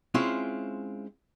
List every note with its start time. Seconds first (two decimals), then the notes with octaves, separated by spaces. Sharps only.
0.14 G#3 C4 C#4 E4 F4 C#5